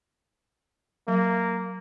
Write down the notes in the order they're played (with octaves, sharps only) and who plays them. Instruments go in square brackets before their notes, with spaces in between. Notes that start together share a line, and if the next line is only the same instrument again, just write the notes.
[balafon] F#3 [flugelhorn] A#3